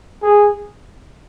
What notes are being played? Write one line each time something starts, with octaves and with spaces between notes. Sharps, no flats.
G#4